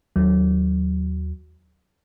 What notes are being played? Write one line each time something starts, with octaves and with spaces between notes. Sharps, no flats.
D#2 F#3